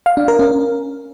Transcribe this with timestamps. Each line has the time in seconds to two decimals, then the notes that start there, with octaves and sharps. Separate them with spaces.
0.06 F5
0.17 D4
0.28 A#4
0.39 C#4